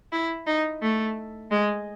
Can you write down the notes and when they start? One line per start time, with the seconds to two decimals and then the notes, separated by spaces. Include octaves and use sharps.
0.12 E4
0.47 D#4
0.82 A3
1.51 G#3